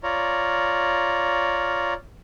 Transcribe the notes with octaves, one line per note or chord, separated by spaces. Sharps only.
F4 C#5 D5 A#5